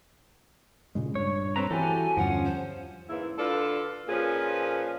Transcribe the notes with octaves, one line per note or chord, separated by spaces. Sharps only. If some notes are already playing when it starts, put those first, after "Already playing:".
A#2 C#3 G#3
G2 C#5
C4 A4 B4 A#5
E3 F#4 G4 A4 G#5
E2 G2 D3 F3 C#4 F#5
C5
G#2 C#3 E3 A#3 E4
D3 F4 A4 B4 D5
A#2 F3 C#4 G#4 B4